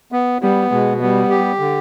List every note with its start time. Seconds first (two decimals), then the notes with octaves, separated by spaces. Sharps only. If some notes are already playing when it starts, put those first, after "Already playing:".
0.12 B3
0.42 G3 B3
0.72 B2 G#3
1.01 G3 B3
1.30 G4
1.59 D3